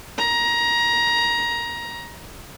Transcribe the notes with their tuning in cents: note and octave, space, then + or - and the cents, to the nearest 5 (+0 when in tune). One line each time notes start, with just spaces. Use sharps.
A#5 +20